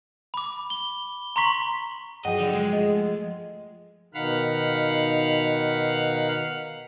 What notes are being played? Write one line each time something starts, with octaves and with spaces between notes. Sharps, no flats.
B5 D6
G7
A#5 C6 C#6 B6 F#7
G2 F3 F#3 G#4 D#5 F#5 G5
D3
G#3 G#4
F3 A3 D#5
B2 D#3 D#4 F5 F#5 B5